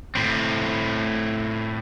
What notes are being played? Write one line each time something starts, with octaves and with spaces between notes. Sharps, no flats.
A2 C4